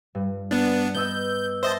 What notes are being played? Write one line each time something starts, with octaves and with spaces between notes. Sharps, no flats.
G2
B3 D4 F6
B3 D#5 E6 G6
C5 D#5 E5 A5